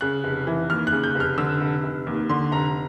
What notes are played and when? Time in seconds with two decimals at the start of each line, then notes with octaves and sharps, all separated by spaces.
0.01 C#3 F#6
0.24 F1
0.47 E3
0.70 D#2 F6
0.87 F#6
0.92 C#3
1.04 G6
1.15 F1
1.20 F6
1.38 D3 E6
1.61 F1
1.83 F1
2.07 D#2
2.29 D3 C6
2.51 F1 A#5